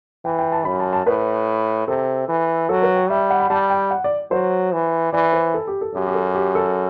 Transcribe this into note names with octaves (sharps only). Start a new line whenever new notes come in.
E3 G5
G5
A5
F#2 B5
A5
A5
A2 B4
C3 A4
E3
F#3 A4
B4
G5
G3 E5
F#5
B5
G3 A5
G5
F#5
D5
F#3 C5
E3
E3 D5
C5
A4
G4
A4
F#2 G4
G4
A4
G4
A4